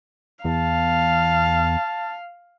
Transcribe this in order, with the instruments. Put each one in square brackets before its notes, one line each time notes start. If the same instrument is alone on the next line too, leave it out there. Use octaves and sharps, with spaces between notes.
[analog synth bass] E2 [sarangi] F5 [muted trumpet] A5